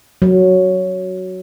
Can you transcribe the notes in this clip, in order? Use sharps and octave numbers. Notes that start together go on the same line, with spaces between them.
F#3